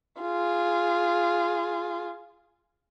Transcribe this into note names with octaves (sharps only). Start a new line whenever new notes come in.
F4 G#4